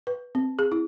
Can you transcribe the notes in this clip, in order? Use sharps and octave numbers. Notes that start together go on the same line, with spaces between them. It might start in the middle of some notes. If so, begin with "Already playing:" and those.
B4
C4
G#4
E4